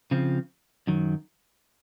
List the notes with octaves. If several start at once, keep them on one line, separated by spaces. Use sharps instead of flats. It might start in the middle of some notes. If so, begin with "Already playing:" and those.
C#3 F3 C4 F4
F#2 D#3 F#3